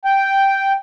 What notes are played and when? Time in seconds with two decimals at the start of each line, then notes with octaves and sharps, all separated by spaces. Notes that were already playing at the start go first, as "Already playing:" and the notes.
0.05 G5